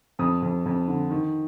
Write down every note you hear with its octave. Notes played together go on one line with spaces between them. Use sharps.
F2 D#6
F2
F2
D3
D#3